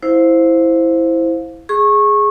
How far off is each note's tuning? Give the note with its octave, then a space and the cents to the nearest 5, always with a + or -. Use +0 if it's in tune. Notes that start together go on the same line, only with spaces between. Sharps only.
E4 +0 C5 +0 F5 +15
G#4 +0 C#6 -20